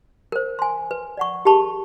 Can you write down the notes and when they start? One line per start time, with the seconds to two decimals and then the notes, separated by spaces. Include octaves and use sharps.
0.32 A#4 C5
0.59 G#5 C6
0.91 B4
1.17 D5 F#5 C#6
1.45 G4 G#4 A#4 A5 B5 C#6